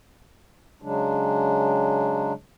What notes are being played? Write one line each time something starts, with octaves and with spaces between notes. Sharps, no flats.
C#3 F#3 G#3 D4